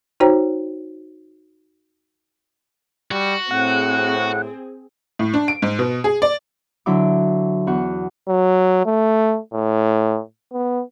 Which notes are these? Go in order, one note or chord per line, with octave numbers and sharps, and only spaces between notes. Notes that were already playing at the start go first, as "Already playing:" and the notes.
D#4 F#4 C5 C#5 G5 A#5
G3 F#4
A2 C4 G#4 F#5
A2
D4
D7
G#2
B2
G#4
D5
D3 F#3 E4 D6
E2 F#4 F#5
F#3
A3
A2
B3